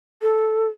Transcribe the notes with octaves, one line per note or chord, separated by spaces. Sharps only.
A4